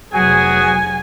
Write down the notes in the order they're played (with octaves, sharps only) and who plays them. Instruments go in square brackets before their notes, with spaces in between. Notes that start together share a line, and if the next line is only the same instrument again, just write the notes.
[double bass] F1 F#3 [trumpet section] B3 F#4 G#4 [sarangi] G#5